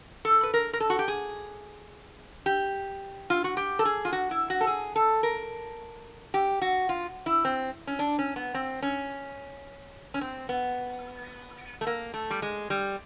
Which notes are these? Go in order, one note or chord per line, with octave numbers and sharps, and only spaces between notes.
A4
B4
A#4
A#4
A4
F#4
G4
G#4
G4
F4
F#4
G4
A4
G#4
F4
F#4
E4
F#4
A4
G#4
A4
A#4
G4
F#4
F4
E4
C4
C#4
D4
C#4
B3
C4
C#4
C#4
C4
B3
A3
A#3
A3
G3
G#3
G3